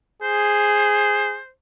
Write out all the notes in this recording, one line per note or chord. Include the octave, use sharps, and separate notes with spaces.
G#4 C5